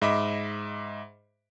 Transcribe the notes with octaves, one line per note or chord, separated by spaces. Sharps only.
G#2 D#5 E5 B5 D6